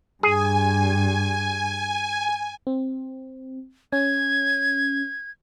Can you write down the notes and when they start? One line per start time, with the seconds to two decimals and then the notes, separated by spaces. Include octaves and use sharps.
0.23 G2 G#4 G#5
2.67 C4
3.93 C#4 G#6